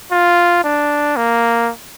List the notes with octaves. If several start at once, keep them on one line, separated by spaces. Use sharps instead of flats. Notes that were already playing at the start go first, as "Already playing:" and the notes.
F4
D4
A#3